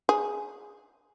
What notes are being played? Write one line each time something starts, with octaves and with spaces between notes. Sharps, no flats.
G#4